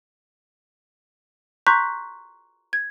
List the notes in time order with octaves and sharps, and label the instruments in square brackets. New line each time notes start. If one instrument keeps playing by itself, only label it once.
[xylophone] A#5 C6 C#6 F#6 G6 B6
G#6